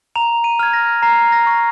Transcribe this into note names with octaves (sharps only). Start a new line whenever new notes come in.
A#5 F7
D#7
F6 G#6
A#6
A#5 C7
A#6
C#6